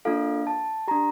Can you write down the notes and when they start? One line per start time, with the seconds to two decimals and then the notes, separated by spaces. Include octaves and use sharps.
0.05 A#3 D4 F4 A4 F5
0.47 A5
0.88 D4 G4 A#5